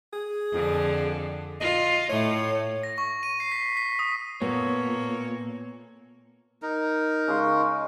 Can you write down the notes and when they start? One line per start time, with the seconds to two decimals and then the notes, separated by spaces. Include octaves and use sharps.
0.13 G#4
0.52 F2 D3
1.61 F4 D#5
2.09 A2 A3 C#5
2.83 A#6
2.98 C#6
3.23 D#7
3.40 C7
3.52 B6
3.77 B6
3.99 D#6
4.42 A#2 A#3 B3 A4 C#5
6.62 D#4 A#4
7.28 C#3 G#3 C6